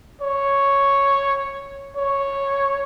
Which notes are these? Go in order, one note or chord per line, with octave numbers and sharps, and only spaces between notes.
C#5
C#5